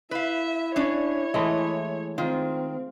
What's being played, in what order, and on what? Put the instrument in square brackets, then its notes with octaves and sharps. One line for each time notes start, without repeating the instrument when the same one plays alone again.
[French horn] E4 [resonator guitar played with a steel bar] B4 F5 [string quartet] E5
[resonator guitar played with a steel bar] C#4 D4 [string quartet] C#5
[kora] E3 G#3 A3 [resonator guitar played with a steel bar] D#5
[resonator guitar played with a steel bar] D#3 [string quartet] C4 [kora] F4